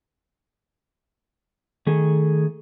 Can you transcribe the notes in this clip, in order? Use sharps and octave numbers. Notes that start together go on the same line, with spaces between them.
D#3 A3 G#4 A4